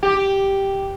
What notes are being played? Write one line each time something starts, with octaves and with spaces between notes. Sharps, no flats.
G4